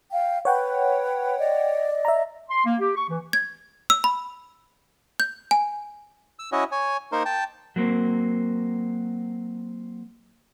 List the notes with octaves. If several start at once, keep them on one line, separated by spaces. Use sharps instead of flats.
F5 G5
B4 C#5 F#5 G5
D5 D#5
E5 A#5
C6
A#3
G4
C#6
E3
G#6
E6
B5
G6
G#5
E6
C#4 E4 F#4 C#5 D#5
C#5 G#5
A#3 D#4 A#4 C5
G5 A5
F#3 A#3 C4